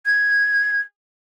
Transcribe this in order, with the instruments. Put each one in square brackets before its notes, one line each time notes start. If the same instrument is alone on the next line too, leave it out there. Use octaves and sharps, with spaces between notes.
[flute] G#6